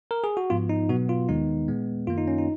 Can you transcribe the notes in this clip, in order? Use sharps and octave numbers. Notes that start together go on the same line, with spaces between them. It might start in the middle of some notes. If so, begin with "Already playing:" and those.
A#4
G#4
F#4
G#2 F3 B3 F4
D#4
B2 F#3 B3 F#4
F4
D#2 D#3 G#3 B3 D#4
A#2 G#3 B3
F#2 D#3 A#3 F4
D#4
C#4
D#4